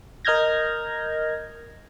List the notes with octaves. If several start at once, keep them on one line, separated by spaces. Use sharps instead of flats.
A#4 D#5 F6 G6 G#6 A#6